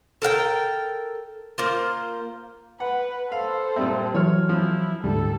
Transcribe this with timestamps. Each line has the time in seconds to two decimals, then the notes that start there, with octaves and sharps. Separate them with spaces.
0.22 A4 A#4 F#5 G5
1.58 A#3 F4 C5
2.80 B4 F#5
3.32 A4 C5 F5
3.76 A#2 G3 C4 E5
4.15 E3 F#3 C#5 F6
4.49 F3 E4
5.04 D2 G#2 D3 G3 A4